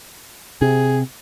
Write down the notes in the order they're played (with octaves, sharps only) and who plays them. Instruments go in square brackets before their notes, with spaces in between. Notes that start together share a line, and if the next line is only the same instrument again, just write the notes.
[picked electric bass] C3 [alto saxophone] G#4